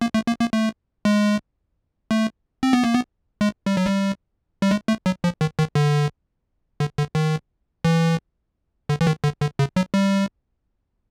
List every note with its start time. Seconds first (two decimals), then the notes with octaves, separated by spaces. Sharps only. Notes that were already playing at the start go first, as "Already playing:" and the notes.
0.01 A#3
0.14 A3
0.27 A#3
0.41 A#3
0.53 A3
1.05 G#3
2.11 A3
2.63 C4
2.73 B3
2.84 A#3
2.94 B3
3.41 G#3
3.66 G3
3.77 F#3
3.86 G3
4.62 G3
4.71 G#3
4.88 A3
5.06 F#3
5.24 F3
5.41 D#3
5.59 D#3
5.75 D3
6.80 D3
6.98 D3
7.15 D#3
7.85 E3
8.89 D3
9.01 E3
9.07 D#3
9.24 D3
9.41 D3
9.59 C#3
9.76 F#3
9.94 G3